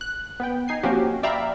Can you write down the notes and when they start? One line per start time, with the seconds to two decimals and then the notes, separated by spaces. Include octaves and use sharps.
0.01 F#6
0.40 B3 B4 G5
0.68 D#4 G#5 C7
0.83 F3 A#3 C4 C#4 F#4 G4
1.23 D5 E5 F5 G5 A#5 B5